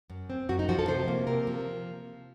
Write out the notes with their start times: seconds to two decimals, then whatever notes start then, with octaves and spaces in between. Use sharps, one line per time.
0.10 F#2
0.30 C4
0.49 F#2 F#4
0.59 D#4
0.69 F3 F#4
0.79 A4
0.88 C3 C5
1.08 A#3
1.27 C3 A#4
1.47 F3